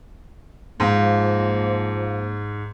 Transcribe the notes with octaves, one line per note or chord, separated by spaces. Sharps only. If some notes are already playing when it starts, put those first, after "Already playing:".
G#2 F3 A#3